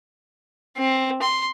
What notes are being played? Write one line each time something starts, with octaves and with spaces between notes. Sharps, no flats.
C4
C6